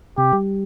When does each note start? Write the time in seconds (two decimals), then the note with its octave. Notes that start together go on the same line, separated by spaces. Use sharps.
0.17 C3 G4
0.33 G3